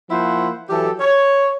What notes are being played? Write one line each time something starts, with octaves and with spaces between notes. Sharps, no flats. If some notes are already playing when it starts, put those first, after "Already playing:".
F3 A#3 E4 C5 F#5
E3 F#3 G4 A4
C#5